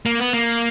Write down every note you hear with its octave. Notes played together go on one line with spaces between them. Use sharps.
A#3
B3
A#3